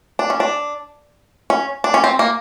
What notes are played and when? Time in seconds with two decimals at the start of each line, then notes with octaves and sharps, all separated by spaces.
0.19 D4
0.30 C#4
0.40 D4
1.50 C#4
1.84 D4
1.94 C#4
2.04 C4
2.19 A#3